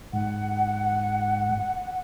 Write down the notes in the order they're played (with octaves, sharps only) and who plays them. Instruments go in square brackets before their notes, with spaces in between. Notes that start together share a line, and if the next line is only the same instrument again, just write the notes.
[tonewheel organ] G#2 [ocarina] F#5